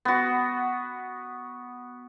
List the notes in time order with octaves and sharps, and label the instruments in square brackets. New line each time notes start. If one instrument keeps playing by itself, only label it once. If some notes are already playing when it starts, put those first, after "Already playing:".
[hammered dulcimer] B3 F#4